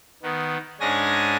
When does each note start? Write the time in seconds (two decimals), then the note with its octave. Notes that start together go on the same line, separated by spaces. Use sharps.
0.22 D#3 B3
0.80 G#2 G#3 C#4 D4 G#5 A#6